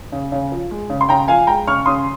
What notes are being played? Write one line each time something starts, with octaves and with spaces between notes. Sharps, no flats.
C#3
C#3
F3
G#3
C#3
C6
C#3 G5 A#5
F3 F5 G#5
G#3 G5 A#5
C#3 C#6 F6
C#3 C6 D#6